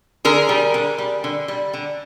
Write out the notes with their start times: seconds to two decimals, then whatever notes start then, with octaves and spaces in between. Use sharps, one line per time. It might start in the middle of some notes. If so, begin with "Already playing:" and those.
0.25 D3 G#4 A#4
0.49 G3
0.74 D3
0.98 G3
1.24 D3
1.48 G3
1.73 D3